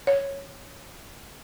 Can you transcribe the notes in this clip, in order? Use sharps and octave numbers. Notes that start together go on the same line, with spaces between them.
C#5